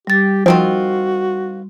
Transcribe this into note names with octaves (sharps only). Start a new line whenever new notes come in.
G3 G4 A6
D#3 F3 C4 F4 F#4